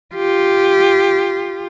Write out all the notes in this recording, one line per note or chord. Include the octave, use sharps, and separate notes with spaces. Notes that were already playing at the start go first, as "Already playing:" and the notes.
F4 G4